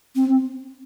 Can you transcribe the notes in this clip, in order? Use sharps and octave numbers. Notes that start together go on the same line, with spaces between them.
C4